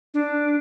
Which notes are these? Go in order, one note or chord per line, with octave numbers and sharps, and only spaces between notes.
D4